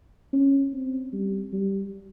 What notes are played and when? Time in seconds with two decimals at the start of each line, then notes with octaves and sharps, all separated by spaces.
0.33 C#4
0.73 C4
1.13 G3
1.53 G3